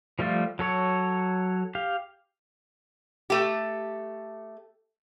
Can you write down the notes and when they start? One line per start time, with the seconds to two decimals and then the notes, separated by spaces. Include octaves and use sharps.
0.19 F3 G3 A3 F4
0.59 F#3 A4 C#5
1.75 G4 F5
3.30 A3 G4